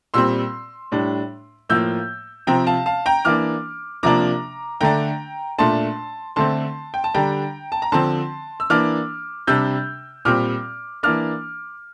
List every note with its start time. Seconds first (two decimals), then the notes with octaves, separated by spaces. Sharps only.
0.14 A#2 G3 C4 C6 E6
0.92 A2 G3 D4
1.69 A2 F3 A#3 E6 G6
2.47 C3 F3 C4 G5 A#5
2.66 F5 A5
2.86 F5 A5
3.06 G5 A#5
3.25 E3 A#3 D4 D6 F6
4.03 C3 F3 A#3 D4 A#5 D6
4.81 D3 A3 D4 G5 A#5
5.58 A#2 A3 D4 A5 C6
6.36 D3 A3 C4 A5 C6
6.94 G5
7.04 A5
7.14 D3 G3 D4 G5 A#5
7.72 A5
7.82 A#5
7.92 D3 F3 C4 A5 C6
8.60 E6
8.70 E3 A#3 D4 D6 F6
9.47 C3 G3 D4 E6 G6
10.25 A#2 G3 C4 D6 F6
11.03 E3 A#3 D4 D6 F6